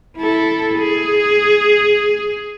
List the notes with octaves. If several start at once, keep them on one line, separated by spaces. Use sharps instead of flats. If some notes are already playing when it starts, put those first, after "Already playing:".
E4 A4
G#4